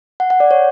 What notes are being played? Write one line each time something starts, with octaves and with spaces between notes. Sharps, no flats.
F#5
F#5
D5
C#5